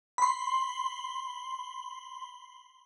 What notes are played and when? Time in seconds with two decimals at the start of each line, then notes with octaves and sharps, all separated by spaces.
0.18 B5 C6